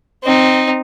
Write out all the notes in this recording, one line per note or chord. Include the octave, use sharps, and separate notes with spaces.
C4 D#4